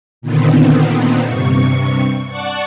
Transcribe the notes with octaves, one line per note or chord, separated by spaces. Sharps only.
A#2 D3 D#3 B3 C4
G2 C3 C#6
D5 F#5 A5 C#6